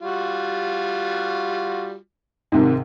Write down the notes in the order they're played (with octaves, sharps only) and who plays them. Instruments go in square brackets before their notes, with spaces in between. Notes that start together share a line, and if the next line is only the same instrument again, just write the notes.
[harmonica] G3 F4 F#4
[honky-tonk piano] G#2 C3 D#3